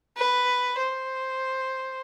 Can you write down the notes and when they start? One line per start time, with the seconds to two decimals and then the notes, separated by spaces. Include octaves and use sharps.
0.17 B4
0.79 C5